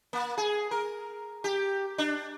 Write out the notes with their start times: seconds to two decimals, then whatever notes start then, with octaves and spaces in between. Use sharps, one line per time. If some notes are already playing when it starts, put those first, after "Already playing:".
0.13 A#3
0.38 G#4
0.71 A#4
1.44 G4
1.98 D4